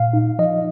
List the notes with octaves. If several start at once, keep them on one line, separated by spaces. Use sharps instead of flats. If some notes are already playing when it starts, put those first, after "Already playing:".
Already playing: A#2 F5
D#4
F3 D#5